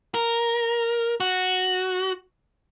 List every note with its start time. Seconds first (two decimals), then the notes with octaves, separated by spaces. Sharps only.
0.14 A#4
1.20 F#4